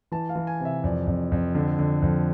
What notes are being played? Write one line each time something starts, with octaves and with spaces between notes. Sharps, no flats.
E3 A5
F5
E3
G#5
C3
E5
F2 D5
F2
F2
D3
D3
F2